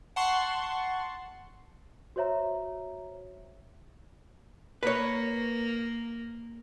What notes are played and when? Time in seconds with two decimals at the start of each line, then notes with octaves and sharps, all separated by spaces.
0.16 F#5 A5 C6 C#6
2.16 F#4 C5 C#5 E5 A#5
4.83 A#3 B4 C#5